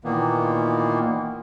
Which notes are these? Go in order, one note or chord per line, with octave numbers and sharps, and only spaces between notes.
A#2 D#3 E3 A#3 B3